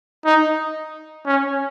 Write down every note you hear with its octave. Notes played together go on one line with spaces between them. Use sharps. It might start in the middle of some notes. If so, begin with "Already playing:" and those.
D#4
C#4